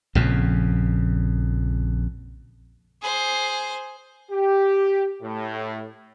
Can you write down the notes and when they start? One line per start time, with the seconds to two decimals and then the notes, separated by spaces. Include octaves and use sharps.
0.15 A#1 F2 C#3
3.02 G#4 C5
4.31 G4
5.23 A2